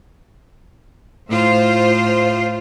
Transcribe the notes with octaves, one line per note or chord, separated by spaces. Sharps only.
A2 F4 C5